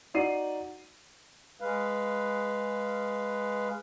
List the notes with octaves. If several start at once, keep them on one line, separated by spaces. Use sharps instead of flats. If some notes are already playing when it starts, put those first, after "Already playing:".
D#4 F#4 D5 C7 D#7
G#3 B4 F5